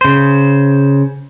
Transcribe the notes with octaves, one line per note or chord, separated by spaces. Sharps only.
C#3 C5